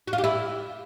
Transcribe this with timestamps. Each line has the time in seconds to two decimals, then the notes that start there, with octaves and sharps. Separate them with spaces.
0.08 F#4
0.13 F4
0.18 G4
0.24 E4